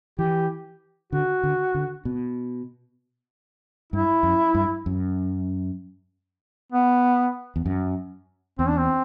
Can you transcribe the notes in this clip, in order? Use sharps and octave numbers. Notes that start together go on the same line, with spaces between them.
E3 G4
D3 F#4
D3
D3
B2
G2 E4
F#2
G2
F#2
B3
E2
F#2
E2 C4
D4
C4